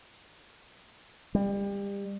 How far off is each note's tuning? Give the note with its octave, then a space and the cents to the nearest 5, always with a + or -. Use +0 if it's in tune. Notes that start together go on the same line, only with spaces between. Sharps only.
G3 +30